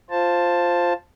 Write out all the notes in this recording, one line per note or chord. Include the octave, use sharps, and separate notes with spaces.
F4 C5 A5